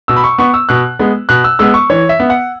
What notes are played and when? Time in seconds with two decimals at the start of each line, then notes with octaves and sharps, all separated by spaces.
0.08 B2 E6
0.16 B5
0.24 C#6
0.38 B3 C#6
0.54 E6
0.69 B2 F#6
0.99 G#3 B3
1.29 B2 F#6
1.44 E6
1.59 G#3 B3 E6
1.74 C#6
1.90 E3 C#5
2.09 E5
2.20 B3
2.30 F#5